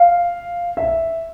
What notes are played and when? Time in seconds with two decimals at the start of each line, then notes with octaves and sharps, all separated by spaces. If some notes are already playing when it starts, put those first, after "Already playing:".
Already playing: F5
0.77 E5